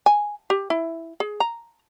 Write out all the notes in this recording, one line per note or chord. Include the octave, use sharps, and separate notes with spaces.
G#5
G4
E4
G#4
A#5